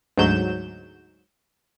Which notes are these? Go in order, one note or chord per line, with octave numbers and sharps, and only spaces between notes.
D2 G#2 F#3 G6 E7